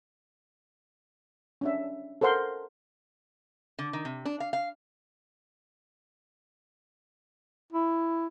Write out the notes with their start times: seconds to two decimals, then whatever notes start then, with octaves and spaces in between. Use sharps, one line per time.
1.61 C#4 D4 E5
2.21 A4 A#4 C5 F#5 C6
3.79 D3
3.93 D#3
4.05 C3
4.25 D4
4.40 F5
4.53 F5
7.73 E4